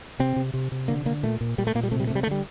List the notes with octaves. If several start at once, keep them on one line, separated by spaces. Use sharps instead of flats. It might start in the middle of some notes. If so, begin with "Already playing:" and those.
C3 C4
C3
C3
C3
D3 A#3
D3 A#3
A#2 A3
A#2
A#2 G3
A3
A#2 A#3
G3
C3 A3
G3
C3 A3
G3
A3
D3 G3